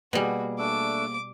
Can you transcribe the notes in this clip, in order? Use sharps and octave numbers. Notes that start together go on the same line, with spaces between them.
B2 G3 A#3 F#4 G#4 G#5
A3 D4 D6 E6